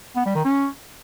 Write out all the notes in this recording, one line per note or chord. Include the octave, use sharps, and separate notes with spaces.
B3
G3
D#3
C#4